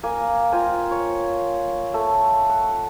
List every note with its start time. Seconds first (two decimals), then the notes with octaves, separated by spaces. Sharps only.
0.03 A#3 G#5
0.52 F4 G5 G#5 A#5
0.91 C#5
1.94 A3
2.49 F#5